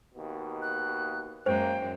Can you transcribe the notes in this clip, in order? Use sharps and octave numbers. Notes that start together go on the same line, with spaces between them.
D#2 B2 A#3
F#6
F#2 G#3 A#3 C5 G5